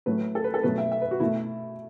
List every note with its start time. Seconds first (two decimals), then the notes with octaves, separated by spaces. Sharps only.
0.06 A2 F#3 A3 B4
0.35 A4
0.44 B4
0.54 A4
0.63 B2 F#3 A3 B4
0.78 E5
0.92 E5
1.02 B4
1.11 F#4
1.20 B2 A3 E4